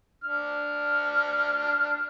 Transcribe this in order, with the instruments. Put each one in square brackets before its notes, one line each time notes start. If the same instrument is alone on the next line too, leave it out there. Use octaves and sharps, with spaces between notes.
[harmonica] D4 F6